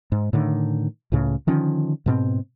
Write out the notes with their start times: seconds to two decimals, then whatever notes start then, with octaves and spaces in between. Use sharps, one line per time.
0.12 G#2
0.33 A2 D3 D#3
1.12 C#2 A2 C#3
1.47 D3 D#3 F3 C#4
2.06 G#2 B2 C4